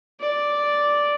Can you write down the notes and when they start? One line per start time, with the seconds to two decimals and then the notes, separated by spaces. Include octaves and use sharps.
0.21 D5